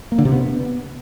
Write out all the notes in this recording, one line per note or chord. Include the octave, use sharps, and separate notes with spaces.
A#3
D3
C3
B3